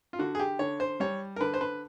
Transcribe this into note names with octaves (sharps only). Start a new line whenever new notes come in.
F4
D3 F#4
G#4
G4
D3 C#5
C5
G3 C#5
A#4
D3 B4
C5
B4